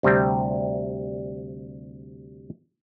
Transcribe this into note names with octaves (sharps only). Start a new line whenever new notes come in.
D2 C3 G3 C4 G5